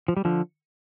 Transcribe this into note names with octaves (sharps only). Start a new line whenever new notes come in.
F3
G3
D3 F3